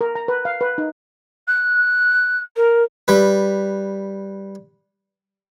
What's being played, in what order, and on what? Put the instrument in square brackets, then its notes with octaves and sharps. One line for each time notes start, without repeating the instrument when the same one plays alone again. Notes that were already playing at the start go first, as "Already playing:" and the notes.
[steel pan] A#4
A#5
B4
F5
B4
D#4
[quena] F#6
A#4
[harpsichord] G3 B4